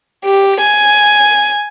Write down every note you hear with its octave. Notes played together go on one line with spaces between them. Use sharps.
G4
G#5